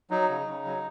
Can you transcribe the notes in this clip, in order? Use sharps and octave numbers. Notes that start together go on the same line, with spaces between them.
F#3 D#4
C#3
C#3
F#3